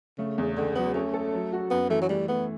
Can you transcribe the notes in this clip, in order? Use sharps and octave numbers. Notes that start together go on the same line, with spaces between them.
C#3 A3
E2
C#2 D3
F#3 B3
A3 C#4
A4
F#3
F#4
F#2 B3
E3 A3
F#3
G3 A3
A3 B3